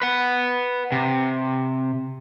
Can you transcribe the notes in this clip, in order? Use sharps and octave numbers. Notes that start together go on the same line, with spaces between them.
B4 F#5
C3